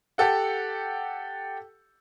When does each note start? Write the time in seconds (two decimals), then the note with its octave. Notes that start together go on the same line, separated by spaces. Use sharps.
0.18 G4 A4 F#5